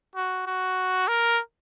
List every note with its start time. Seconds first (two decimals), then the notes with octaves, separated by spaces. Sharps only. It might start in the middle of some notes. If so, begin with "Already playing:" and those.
0.16 F#4
0.47 F#4
1.08 A#4